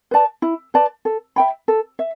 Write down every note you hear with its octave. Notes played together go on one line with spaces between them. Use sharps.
B4 D5 A5
E4
B4 D5 A5
A4
E5 G5 B5
A4
E5